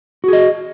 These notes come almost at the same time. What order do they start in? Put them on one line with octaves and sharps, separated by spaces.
F#4 G#4 D#5